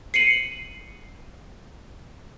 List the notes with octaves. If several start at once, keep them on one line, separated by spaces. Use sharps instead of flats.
C7 C#7 D#7 F#7